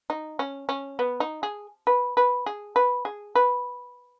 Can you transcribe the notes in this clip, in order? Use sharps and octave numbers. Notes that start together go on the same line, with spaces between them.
D#4
C#4
C#4
B3
D#4
G#4
B4
B4
G#4
B4
G#4
B4